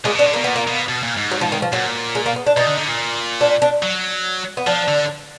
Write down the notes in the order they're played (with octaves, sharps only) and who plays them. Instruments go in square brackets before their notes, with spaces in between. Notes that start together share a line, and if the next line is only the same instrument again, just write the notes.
[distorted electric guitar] A#2 [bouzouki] G#3
[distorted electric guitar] B2 [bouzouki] D4
[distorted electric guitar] D3
[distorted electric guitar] B2 [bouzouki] A#3
[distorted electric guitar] A#2 [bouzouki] B3
[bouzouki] A#3
[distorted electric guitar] B2
B2
A#2
G#2
[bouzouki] F#3
F3
D#3
F3
[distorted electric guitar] A#2 [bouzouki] F#3
[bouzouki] G#3
A#3
B3
D4
[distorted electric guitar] B2 [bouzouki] D#4
[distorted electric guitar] D3
D3
A#2
[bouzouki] D4
D4
[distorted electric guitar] F#3
[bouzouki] B3
[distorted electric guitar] F3 [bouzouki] D4
[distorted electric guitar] D3